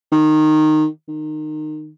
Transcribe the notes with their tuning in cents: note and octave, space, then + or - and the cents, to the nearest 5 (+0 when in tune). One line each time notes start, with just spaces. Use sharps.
D#3 -10
D#3 -25